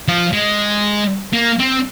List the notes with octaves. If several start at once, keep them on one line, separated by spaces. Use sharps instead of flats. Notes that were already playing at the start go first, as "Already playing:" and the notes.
F3
G#3
A#3
C4